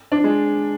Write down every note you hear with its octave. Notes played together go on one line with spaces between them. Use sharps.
D4
G#3